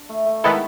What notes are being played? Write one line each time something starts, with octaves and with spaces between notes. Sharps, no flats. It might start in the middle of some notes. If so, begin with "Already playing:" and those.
Already playing: D4
A3
A3
D#3 G#3 B3 E4 A4